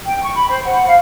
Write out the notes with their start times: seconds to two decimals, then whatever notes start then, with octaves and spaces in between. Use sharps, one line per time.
0.05 G5
0.24 C#6
0.35 B5
0.50 C5
0.64 F#5
0.87 F5